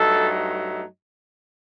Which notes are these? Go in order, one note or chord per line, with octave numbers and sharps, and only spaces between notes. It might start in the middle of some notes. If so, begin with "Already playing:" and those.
Already playing: G2 F#3 A3 D#4 A4